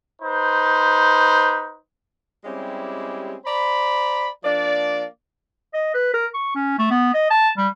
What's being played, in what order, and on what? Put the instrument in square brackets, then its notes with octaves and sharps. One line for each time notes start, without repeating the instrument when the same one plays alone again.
[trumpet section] D#4 B4 C5
[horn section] G3 G#3 C4 C#4 E4 G4
C5 D5 A#5 B5
F3 A#3 D4 D5
[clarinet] D#5
B4
A#4
C#6
C#4
A3
B3
D#5
A5
G3